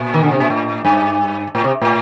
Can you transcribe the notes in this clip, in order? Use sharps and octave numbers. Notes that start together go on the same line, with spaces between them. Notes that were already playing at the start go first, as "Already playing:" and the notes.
Already playing: A#2
D#3
D3
C3
A#2
A2
G2
A2
C3
A2